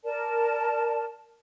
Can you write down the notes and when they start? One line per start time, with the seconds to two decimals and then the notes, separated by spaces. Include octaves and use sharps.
0.04 A#4 D5 A5